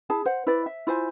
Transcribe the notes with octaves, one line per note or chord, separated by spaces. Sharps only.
E4 G#4 A5
C5 F#5
E4 B4 D5
E5
E4 F4 C5 G#5